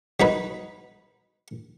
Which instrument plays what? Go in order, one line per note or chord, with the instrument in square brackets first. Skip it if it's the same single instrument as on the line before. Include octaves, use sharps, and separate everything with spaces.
[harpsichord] F#3 D#4 B4